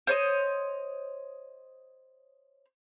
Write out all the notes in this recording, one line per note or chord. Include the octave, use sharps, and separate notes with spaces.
C5 C#5 D#5